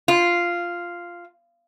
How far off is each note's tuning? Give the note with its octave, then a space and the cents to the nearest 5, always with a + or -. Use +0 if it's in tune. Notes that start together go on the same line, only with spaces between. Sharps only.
F4 -5